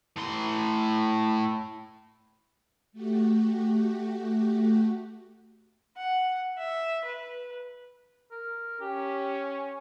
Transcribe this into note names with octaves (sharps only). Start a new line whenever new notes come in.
A2 C6
A3 F#4 G4
F#5
E5
B4
A#4
C#4 G4